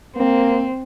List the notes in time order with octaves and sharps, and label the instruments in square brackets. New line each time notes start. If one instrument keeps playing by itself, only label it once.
[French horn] A#3 [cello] C4